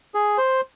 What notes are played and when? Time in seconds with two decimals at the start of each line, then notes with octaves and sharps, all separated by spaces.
0.14 G#4
0.38 C5